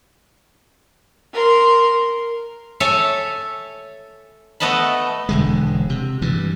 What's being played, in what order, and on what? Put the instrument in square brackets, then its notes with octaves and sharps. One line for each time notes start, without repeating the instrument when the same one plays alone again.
[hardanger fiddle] A#4 C6
[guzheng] A4 C#5 E5 G#5 A5
A3 B3 D#5 A5 B5
[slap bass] E1 D3 G#3
C3
G2 E3